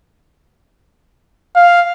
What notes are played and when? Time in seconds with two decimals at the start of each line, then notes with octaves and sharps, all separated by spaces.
1.56 F5